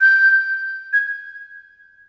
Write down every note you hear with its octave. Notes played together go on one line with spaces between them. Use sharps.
G6
G#6